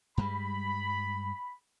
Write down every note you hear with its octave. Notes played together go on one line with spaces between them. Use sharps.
G2 G3 G#3 B5